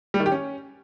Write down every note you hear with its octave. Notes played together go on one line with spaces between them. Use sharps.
G3
D#3
G4
C#4